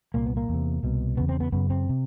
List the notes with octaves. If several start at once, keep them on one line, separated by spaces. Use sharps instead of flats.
C2 A#2 A#3
B3
A#3
E2 C3
C2 B2
E2 C#3 B3
C4
B3
F#2 C#3 B3
C4
C3